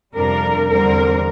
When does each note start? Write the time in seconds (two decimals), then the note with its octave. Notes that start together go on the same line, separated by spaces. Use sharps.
0.15 F2 C3 G3 D4 A#4
0.69 E2 D3 G3 C4 A#4